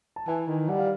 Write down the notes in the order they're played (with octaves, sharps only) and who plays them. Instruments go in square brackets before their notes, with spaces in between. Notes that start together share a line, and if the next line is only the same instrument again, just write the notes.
[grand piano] A5
[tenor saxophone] E3 [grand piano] G#5
[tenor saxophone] D#3
[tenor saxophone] G3 [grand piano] F#5
[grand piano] F5